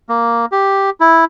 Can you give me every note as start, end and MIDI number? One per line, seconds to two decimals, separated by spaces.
0.09 0.46 58
0.52 0.90 67
1.00 1.25 64